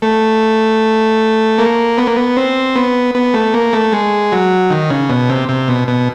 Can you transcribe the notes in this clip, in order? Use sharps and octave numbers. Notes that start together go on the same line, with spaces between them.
A3
A#3
B3
A#3
B3
C4
B3
B3
A3
A#3
A3
G#3
F#3
D#3
C#3
B2
C3
C3
B2
B2